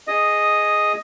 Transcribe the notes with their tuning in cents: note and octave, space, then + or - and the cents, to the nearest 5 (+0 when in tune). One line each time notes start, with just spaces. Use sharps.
G#4 +0 D#5 +0